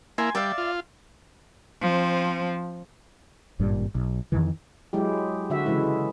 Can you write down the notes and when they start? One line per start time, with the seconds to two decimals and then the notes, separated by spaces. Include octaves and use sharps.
0.18 A#3 E4 G#5 C6
0.35 G3 D5 E5 F5
0.58 F4
1.81 F3 C4
3.59 G#1 G2 A#2 G3
3.95 B1
4.32 F2 C3 D#3 E3
4.93 F#3 G#3 E4 G4
5.50 D3 F#4 E5
5.66 C#3 E3 G#3 E4